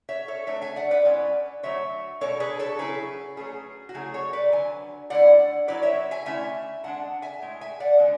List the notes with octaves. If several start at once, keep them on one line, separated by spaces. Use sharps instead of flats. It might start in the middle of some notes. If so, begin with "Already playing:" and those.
C#5 E5
A4 C#5
F#3 A3 D4 C#5 E5
E5 G#5
D5 F#5
B4 D5
B2 G#3 C#4 E4 B4 D5
D3 F#3 A3 C#5 E5
B2 G#3 D4 A4 C#5
G#4 B4
A4 C#5
C#3 F#3 C#4 E4 G#4 B4
F#3 A3 C#4 G#4
F#4
C#3 F#3 A3 E4 G#4
A4 C#5
B4 D5
D3 F#3 G#5
D3 A3 E4 D5 F#5
F#3 C#4 E4 B4 D5
C#5 E5
E5 G#5
D3 A3 C#4 E4 E5 G#5
D3 G#3 D4 F#5 A5
E5 G#5
A2 G#3
E5 G#5
D5 F#5
D3 G#3 B3 D4